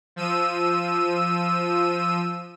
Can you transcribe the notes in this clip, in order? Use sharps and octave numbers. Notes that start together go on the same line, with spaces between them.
F3 E6 D#7